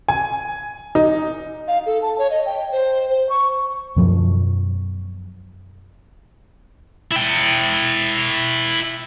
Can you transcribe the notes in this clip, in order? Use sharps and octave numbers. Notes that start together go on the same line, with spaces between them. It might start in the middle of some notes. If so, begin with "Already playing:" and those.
G#5
D#4
F5
A4
A5
C#5
D#5
G5
C5
C5
C#6
F#2 B2 F3 F#3
E4 G5